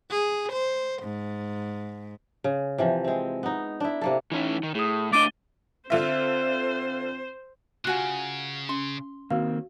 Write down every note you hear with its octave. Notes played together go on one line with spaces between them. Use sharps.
G#4
C5
G#2
C#3
C3 E3 F3
G#3 C4
B3 D#4
D4 E4
C3 A#3 A4
E3 C#4 D#4 E4
D#3
A2 G#4 D#6
A3 D4 D#5 D6 A6 D#7 G7
D3 C4 F4 C5 E5
C#3 F4 F#4 G#5 F#6
C#4 C6
D#3 A#3 C4 F#4 F5